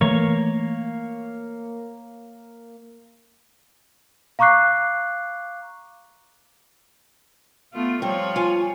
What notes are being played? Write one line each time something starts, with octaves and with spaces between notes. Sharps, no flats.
E3 A3 A#3 C#5
F5 A#5 C#6 D6 F#6 C7
A3 B3 F4
F3 G3 C4 C#5
F4 G#5